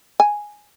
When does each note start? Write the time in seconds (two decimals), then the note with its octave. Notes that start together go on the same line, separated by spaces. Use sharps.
0.20 G#5